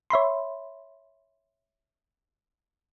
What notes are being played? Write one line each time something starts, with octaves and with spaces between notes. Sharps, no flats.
C#5 E5 B5 C6